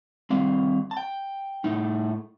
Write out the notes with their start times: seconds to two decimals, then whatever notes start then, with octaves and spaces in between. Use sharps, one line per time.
0.30 D#3 G3 C4 F5
0.91 A5
0.97 G5
1.64 A2 A3 D#4